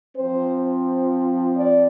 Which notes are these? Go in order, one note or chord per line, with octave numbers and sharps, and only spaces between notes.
F3 C4 C5
D5